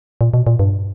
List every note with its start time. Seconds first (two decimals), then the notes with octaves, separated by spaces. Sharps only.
0.21 A#2
0.34 B2
0.47 A#2
0.59 G2